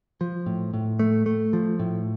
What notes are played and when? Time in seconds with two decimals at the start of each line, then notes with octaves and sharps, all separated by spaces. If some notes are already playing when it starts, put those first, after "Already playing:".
0.21 F3
0.46 A2
0.74 A2
0.99 A3
1.26 A3
1.53 F3
1.79 A2